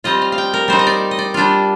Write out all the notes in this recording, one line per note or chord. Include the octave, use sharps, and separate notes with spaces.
G3 C4 F4 D#5
F5
F5
G5
A#4
G3 C4 D#4 C5
D#5
D5
D#5
D5
G3 D4 F4